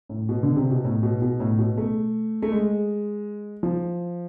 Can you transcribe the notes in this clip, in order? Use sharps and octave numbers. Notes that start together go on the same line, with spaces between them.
A2
B2
D3
C3
B2
A2
B2
B2
A2
B2
A3
A3
G#3
F3